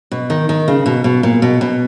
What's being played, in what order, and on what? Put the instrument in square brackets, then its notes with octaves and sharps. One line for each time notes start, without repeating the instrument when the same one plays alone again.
[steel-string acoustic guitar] B2
D#3
D#3
C#3
B2
B2
A#2
B2
B2